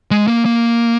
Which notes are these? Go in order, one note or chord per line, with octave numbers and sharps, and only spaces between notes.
G#3
A#3
A#3